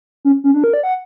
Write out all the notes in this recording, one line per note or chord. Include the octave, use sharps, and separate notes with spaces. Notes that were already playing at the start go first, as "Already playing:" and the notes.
C#4
C#4
D4
A#4
D5
F#5